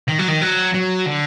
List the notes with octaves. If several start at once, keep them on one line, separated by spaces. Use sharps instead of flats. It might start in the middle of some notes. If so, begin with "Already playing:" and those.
D#3
F#3
D#3
F#3
F#3
D3